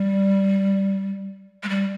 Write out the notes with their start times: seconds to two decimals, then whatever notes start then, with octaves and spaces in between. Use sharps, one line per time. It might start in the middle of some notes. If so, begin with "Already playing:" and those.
Already playing: G3
1.63 G#3
1.69 G3